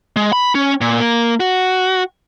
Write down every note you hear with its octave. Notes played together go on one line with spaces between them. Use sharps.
G#3
B5
C#4
A#2
A#3
F#4